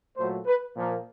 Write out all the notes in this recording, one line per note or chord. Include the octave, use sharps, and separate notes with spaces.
A#2 F#3 A3 C5
B4
A#2 F3 A#3